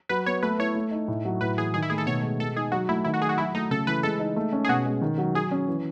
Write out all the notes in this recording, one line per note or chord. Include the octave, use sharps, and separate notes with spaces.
F#3 B4
B3 C#5
A3 B4
E4 C#5
A3
D#4
A2
F#3
A2 B4
E3 G#4
D#3 G#4
E4
A3 G#4
A4
B2 C#5
G#3
G#3 A4
D#4 G#4
F#3 F#4
A3 E4
D#3 E4
F#4
F#3 G#4
F#4
F#3 E4
A3 D#4
C#3 A4
E3 B4
G#3 A4
D#4
A3
C#4
G#4
B2 F#4
G#3
D#3
F#3
F#3 G#4
C#4
E3